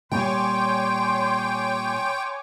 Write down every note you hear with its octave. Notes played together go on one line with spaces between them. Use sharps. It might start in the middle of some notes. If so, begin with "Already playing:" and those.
A#2 G3 C#5 G5 G#5 C6 D6